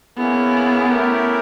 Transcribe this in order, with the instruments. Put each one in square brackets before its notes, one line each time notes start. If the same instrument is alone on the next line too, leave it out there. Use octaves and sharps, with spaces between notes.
[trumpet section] A#3 C#4 E4 G#4 [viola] B3
[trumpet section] A3 C#4 E4 G4 A#4